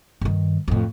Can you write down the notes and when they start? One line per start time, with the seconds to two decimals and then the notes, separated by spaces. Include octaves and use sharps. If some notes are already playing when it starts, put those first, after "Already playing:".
0.21 G2 D#3
0.68 F2 A2